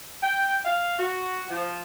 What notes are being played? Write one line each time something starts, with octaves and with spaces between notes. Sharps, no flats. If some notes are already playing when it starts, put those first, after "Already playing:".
G5
F5
F#4
F3